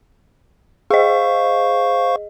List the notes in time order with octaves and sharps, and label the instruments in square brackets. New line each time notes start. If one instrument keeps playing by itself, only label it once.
[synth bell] G#4 D#5 [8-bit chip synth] C5 F5 C#6